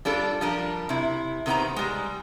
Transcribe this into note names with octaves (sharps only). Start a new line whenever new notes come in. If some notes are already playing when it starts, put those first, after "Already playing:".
G3 D4 F4 A4
F3 G3 D4 A#4
C3 E4
C3 D#3 G#3 B3 C5 A#5
G3 G#3